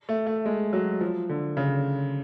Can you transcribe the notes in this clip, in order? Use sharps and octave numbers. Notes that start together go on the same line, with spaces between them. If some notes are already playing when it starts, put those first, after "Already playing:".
A3
A3
G#3
F#3
F3
D3
C#3